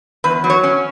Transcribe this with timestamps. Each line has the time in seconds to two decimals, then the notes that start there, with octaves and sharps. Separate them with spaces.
0.24 E2 B4
0.44 F#3
0.50 C#5
0.64 C#4